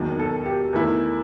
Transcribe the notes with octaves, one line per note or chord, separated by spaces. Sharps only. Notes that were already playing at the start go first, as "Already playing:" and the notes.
Already playing: E1 D#2 D#3 F#3
A4
G4
E2 D#3 A3 E4